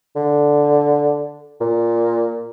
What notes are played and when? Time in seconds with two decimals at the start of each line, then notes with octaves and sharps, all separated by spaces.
0.16 D3
1.60 A#2